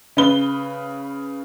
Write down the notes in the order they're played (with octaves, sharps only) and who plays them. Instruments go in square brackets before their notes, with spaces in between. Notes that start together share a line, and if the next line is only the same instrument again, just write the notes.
[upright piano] C#3 B4 G7